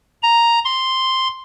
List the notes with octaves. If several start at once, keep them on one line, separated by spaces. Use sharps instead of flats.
A#5
C6